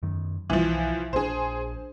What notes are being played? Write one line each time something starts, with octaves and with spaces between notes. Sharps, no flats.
F#2 D#3
B1 E3 F3
A#1 D4 G#4 C5